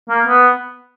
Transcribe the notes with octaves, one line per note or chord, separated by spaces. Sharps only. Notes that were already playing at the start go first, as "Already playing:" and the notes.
A#3
B3